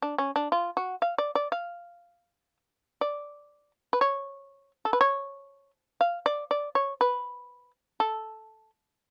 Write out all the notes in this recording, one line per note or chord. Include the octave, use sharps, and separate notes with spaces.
D4
C#4
D4
F4
F#4
F5
D5
D5
F5
D5
B4
C#5
A4
B4
C#5
F5
D5
D5
C#5
B4
A4